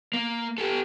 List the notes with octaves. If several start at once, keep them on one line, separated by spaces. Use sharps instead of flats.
A#3
G4 A4